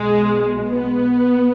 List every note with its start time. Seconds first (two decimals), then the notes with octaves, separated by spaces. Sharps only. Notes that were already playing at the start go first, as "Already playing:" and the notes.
Already playing: B1 B2 G#3
0.70 B3